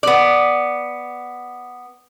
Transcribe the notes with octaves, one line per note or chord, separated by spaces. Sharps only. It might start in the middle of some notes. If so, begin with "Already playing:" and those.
B3 D5